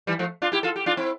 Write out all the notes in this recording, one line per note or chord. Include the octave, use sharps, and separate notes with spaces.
E3 G3
F3 A3
D4 F4
E4 G4
F4 A4
G4
D4 F4
C4 E4